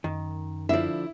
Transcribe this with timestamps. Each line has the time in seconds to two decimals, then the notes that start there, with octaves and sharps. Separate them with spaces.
0.04 F#2 D#3
0.69 D3 F3 E4 D5 E5